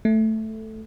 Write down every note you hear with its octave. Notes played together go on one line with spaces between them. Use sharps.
A3